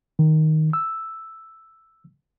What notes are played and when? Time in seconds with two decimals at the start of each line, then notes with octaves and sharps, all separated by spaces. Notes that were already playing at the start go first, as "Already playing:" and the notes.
0.19 D#3
0.73 E6